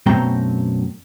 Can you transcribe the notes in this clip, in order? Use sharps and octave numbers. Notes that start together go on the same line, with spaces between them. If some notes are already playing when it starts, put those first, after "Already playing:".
F#2 B2 A3 C4 G5 A#5